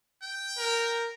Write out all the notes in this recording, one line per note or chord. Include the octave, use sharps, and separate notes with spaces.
G5
A#4